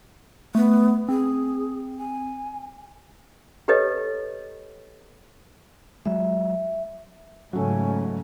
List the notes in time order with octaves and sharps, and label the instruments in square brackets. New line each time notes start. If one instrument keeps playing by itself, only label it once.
[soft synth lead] A3 [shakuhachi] B3
[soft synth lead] C4 [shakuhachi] G#4
[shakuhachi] G#5
[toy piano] G4 A4 B4 C#5 D#5
[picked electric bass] F#3 G#3 [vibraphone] E5
[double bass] G#2 C#3 [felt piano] F#3 A3 [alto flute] C#4